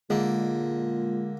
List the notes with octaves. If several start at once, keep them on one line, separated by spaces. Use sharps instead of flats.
A#2 D3 G#3 A#3